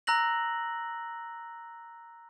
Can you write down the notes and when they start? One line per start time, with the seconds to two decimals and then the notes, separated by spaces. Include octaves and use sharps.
0.07 A#5 E6 F#6 A#6 F#7